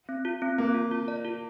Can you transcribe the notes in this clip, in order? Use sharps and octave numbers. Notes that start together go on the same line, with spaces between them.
C4
F4
C4
A#3 C4
F4
F4
D5
F4